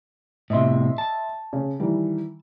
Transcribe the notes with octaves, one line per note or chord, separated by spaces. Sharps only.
A2 C3 D#5 E5 C6
A5
C#3
D#3 E3 G3